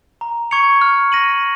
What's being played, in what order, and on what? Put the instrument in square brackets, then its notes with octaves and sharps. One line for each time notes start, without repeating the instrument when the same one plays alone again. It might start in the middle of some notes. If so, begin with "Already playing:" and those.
[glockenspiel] A#5
C#6 G#6 C#7 F7
F6
A#6 D#7 F#7